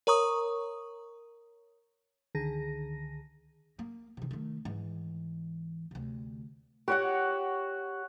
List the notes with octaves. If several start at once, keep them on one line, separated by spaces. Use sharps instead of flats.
A#4 C#5 A#5 C#6 D#6
C#2 D3 D#3 G#4 A#6
A#3
C3 D#3
D#3 A3
G#2 E3
D2 C3
F#4 G4 C#5 F#5